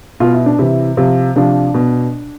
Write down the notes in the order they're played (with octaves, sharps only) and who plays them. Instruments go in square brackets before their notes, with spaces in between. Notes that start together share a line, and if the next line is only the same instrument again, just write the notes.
[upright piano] B2 F4
E4
D4
C3 E3 E4
C3 F3
C3 F3 D4
B2